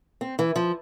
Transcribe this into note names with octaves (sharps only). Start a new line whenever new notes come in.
C4
E3
F3